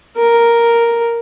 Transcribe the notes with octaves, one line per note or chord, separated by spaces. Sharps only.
A#4